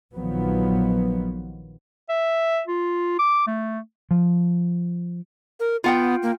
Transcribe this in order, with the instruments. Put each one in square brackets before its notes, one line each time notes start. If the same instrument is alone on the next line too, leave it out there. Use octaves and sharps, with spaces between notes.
[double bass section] A#1 D#3 F3 F#3 B3
[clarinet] E5
F4
D6
A3
[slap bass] F3
[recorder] A#4
[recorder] B3 [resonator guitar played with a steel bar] F4 F#5 G5
[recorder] A#3